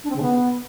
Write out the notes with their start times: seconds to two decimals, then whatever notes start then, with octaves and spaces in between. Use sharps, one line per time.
0.04 D4
0.10 C4
0.16 C#3
0.22 B3